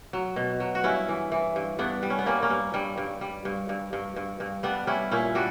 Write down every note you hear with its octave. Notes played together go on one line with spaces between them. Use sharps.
F#3
B2
F#3
F#4
G2 C#4 E4
E3
E3
G2
G2 B3 D4
G3
C#4
B3
G3 A#3 C#4
A#3 C#4
G2
G2 G3
G2
G3
G2
G2
G2
G2
G2
G3 B3 D4
G3 C#4 E4
A#2 C#4 E4
G3 D4 F#4